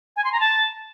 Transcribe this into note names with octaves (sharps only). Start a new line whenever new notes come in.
G#5
C6
A#5
A5